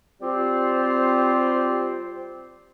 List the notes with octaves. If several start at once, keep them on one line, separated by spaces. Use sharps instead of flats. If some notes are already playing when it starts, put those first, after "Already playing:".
G3 C4 F4 G4 C5